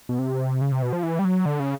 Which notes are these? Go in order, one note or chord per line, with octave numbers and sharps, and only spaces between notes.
B2
C3
C#3
C3
B2
F3
E3
G3
F#3
D3
C#3